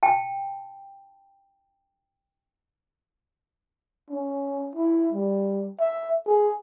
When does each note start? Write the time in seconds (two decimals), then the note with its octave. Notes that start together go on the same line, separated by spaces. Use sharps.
0.03 G5 A5
4.10 C#4
4.76 E4
5.13 G3
5.80 E5
6.27 G#4